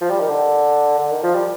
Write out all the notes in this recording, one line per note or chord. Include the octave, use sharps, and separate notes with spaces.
F3
G3
D#3
D3
D3
D#3
F3
G3